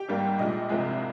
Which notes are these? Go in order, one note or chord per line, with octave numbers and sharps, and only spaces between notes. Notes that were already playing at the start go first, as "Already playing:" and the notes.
Already playing: G4 G5
G#1 G#2 G3 A#3
A#1 A#2 G#3 D#5
C2 C3 F3 G#3